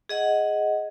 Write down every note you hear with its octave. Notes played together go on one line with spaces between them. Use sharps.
G#4 D#5 F#5